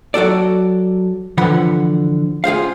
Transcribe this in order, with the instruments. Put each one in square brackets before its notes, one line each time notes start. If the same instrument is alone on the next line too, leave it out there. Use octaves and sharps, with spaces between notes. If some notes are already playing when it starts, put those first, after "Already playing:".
[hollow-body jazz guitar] F#3 F#4 A4 D5
D3 E3 F3 F#5 B5
F4 G#4 C5 F5